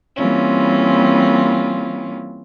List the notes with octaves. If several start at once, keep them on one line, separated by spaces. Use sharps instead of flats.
E3 G3 A#3 C4 C#4 F4